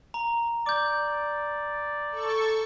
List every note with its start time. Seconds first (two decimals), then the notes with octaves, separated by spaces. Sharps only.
0.14 A#5
0.66 D5 D6 G6
2.11 A4 C#6